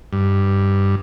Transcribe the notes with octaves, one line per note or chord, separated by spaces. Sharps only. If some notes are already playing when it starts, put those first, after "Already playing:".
G2